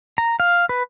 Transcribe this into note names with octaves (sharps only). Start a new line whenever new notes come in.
A#5
F5
B4